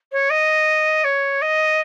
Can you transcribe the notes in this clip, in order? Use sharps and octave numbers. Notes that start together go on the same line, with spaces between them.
C#5
D#5
C#5
D#5